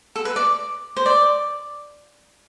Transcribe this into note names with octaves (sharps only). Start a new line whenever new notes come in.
A4
B4
D5
C5
D5